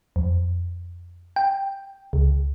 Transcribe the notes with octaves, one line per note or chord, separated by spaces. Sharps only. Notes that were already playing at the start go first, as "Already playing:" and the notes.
F2
G5
C#2